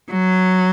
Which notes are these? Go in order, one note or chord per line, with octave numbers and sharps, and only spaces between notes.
F#3